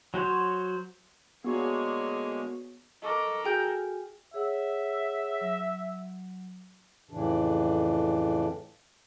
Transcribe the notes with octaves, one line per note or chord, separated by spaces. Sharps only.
F#3 F#4 C5 C#5
D3 G#3 A#3 B3 F#4 G#4 C#5
A4 A#4 D#5 C#6 D6
F#4 G#4 G5 G#5 F6 G6
G#4 C#5 E5 F#5
F#3
F2 A2 C#3 E3 D4